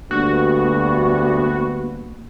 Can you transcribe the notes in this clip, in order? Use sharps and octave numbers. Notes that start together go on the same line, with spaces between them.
D2 G2 A#3 B3 F#4